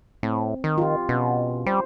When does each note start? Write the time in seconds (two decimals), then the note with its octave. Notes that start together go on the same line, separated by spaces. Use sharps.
0.23 A2 C4
0.64 D#3
0.78 F4 G4
1.09 B2 C#4
1.66 G3 C5